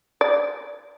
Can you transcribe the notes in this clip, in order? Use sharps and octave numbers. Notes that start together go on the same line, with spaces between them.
D5